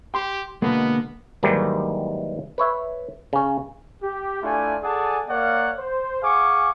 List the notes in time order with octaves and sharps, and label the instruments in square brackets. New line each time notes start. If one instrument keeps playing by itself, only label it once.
[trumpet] G4 [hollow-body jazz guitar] C6
[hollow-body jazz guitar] B2 D3 G#3 [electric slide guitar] A#3 [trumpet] B3
[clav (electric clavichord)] D#2 G#2 D#3 E3 F#3 G3
B4 C#5 E5
C#3 C#4
[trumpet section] G4
A3 D4 E4 F4 D5 G#5
G#4 A4 D5 F#5 G#5 A5
A#3 A#4 C#5 D5 F5 F#5
C5
G#4 F5 F#5 G#5 C#6 D6